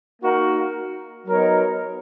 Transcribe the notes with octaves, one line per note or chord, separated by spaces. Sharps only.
A#3 D#4 F#4 A#4
F#3 B3 D#4 A#4 C#5